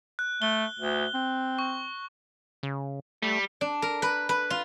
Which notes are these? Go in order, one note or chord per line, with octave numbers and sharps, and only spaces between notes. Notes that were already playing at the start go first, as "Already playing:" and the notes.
F#6
A3 G7
D2
C4
C#6
C#3
G3 A3
D4
A#4
B4
B4
F4